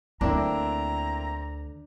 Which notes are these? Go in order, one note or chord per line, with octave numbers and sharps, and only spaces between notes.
D2 A#3 C4 D4 E4 A#5